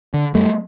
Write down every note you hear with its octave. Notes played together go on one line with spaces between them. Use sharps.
D3
F#2 G3 A3